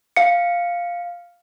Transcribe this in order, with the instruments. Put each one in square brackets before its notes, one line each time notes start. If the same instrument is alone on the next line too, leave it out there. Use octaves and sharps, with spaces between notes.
[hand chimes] F5 C#7